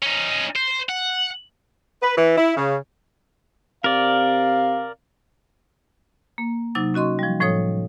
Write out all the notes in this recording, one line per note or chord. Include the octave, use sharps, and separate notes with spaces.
C#4 D#4
C5
F#5
B4
E3
E4
C#3
C3 A#4 D5 F5
A#3
C3 F#3 D#4 D6 A6
C#4 F#4 D#5 C6 C#6
F3 G3
A2 F3 A4 C#5 D#6